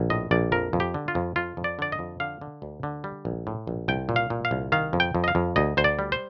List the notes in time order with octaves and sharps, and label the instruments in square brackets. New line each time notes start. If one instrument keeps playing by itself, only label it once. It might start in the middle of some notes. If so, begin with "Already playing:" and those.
Already playing: [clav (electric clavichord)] A#1
A2 D#5
A#1 D5
F2 A#4
F2
G4
D3
F4
F2
F2 F4
F2
D5
D3 D5
D#5
F2
D3 F5
D3
D2
D3
G3
A#1
A2
A#1
C2 G5
A#2
F5
A#2
F5
C2
D#3 F5
F2
G5
F2
D#5
F5
F2
D2 D#5
D2 C5
D5
G3
C5